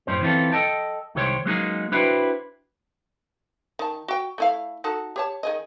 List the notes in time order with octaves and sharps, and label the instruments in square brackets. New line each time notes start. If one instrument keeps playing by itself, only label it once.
[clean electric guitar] F#2 A2 C#4 G4 C5
E3 C4 C#4 F4 A4
A4 D#5 G5 A5
C2 D#3 G#3 G4 C5 C#5
F#3 G#3 A#3 C#4 D#4 G#4
D4 E4 F#4 B4 C5 G5
[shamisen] D#3 A5
F#4 G5
A3 E4 F5
D#4 F#4 A4
G4 C#5 A5
D#3 G#4 D#5